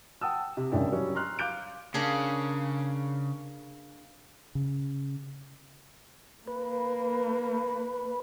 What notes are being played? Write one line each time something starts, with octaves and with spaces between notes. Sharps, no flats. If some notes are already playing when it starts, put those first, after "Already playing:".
F#5 G5 A5 D#6 E6
C3
G#1 F#2 C#3 D4 E4 G5
F#3 G3 C#4
A#5 C6 F6 F#6
F5 D6 F#6 G6 D7 F7
C#3 A#3 D4 G#4
C#3
A#3 B4